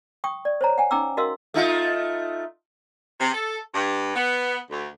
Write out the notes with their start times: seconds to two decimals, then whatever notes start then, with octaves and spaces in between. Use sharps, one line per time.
0.24 G5 C#6 D#6
0.45 D5
0.61 C5 C#5 A#5
0.78 F#5 G#5
0.91 C#4 D#4 G5 A#5 D6 E6
1.17 F#4 A#4 D#5 F5 C6 E6
1.54 A3 D#4 F4
3.20 C3
3.33 A4
3.74 G2
4.15 B3
4.69 D2